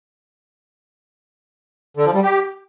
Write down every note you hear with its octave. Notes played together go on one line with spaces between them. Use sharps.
D3
F3
G3
G4